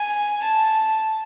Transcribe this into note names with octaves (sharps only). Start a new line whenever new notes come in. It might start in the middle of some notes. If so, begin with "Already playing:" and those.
Already playing: G#5
A5